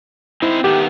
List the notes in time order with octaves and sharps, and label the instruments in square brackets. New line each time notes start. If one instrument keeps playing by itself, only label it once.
[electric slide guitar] C4 D#4 C5 [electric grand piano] E4
[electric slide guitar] D#3 A3 B3 [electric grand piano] G4